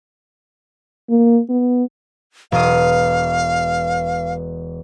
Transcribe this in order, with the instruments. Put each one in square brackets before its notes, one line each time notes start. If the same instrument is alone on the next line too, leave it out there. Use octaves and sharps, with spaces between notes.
[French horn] A#3
B3
[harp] E1 D#6 [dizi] F5